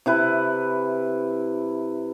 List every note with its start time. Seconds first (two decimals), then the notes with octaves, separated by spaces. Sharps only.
0.06 C3 E4 B4